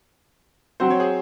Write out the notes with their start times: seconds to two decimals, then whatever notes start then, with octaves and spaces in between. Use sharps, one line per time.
0.80 F#3 C4 F#4 C5
0.90 C#5
1.00 G#4 C5